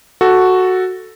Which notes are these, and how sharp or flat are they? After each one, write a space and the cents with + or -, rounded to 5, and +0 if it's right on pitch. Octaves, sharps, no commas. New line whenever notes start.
F#4 +0 A4 +0